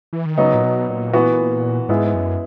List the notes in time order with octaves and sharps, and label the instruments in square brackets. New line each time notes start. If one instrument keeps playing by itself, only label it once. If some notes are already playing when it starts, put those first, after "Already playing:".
[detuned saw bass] E3
D#3
[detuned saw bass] C#3 [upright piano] F#3 B3 D#4
[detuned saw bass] A#2
B2
A#2
[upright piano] E3 B3 F#4
[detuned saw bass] G#2 [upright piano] G#3 B3 E4
[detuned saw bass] F#2